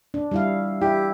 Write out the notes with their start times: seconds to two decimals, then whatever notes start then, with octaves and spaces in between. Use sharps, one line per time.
0.14 D4
0.31 G3 E4 F5
0.82 E4 G4